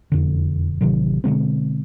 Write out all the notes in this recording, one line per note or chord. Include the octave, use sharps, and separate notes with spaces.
E1 F2 D3
A1 C3 D#3 F#3
B2 D3 G#3 C4